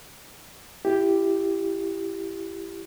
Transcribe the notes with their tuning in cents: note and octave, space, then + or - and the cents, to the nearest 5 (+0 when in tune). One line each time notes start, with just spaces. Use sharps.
E4 +25 G4 +0